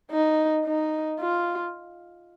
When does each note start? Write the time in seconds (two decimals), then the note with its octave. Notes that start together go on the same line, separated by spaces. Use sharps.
0.11 D#4
0.65 D#4
1.20 F4